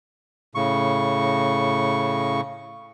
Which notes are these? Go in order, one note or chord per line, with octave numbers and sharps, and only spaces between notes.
A2 C#3 C#6